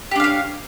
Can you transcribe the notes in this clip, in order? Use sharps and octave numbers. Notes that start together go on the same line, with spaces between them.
D4 G4 C#5 F5